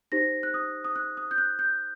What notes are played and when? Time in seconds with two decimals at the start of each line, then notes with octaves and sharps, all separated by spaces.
0.12 D#4 G4 C5 A#6
0.43 F#6
0.54 D#6
0.85 D#6
0.96 F#6
1.17 D#6
1.31 G6
1.38 F#6
1.59 G6